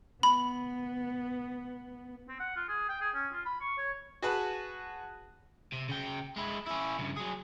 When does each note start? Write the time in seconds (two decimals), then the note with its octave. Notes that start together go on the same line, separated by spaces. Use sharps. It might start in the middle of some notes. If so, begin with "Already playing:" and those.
0.23 B3 B5
2.28 C4
2.40 F#5
2.56 F4
2.68 G#4
2.89 G5
3.01 G#4
3.14 C#4
3.33 F4
3.46 B5
3.61 C#6
3.78 C#5
4.22 F#4 G#4 B4 A5
5.72 C3
5.89 C#3 G5
6.36 G#3 E4
6.67 C#4 E4
6.99 G2 C#3
7.16 F#3 G#4